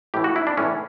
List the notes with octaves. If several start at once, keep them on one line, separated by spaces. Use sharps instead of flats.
A2 E3 G4
F#4
E4
D4
A2 C#4
E3